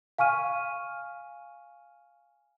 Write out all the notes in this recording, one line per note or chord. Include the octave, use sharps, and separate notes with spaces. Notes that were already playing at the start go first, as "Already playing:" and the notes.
F5 G#5 C#6 F6 D#7